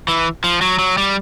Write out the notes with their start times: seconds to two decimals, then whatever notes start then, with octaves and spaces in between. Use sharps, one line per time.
0.08 E3
0.44 F3
0.61 F#3
0.79 F#3
0.98 G3